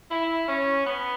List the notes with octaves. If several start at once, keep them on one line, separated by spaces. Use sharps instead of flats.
E4
C#4
B3